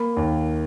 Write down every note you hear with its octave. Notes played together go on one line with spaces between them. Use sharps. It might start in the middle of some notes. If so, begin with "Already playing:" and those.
Already playing: A#3 B5
D#2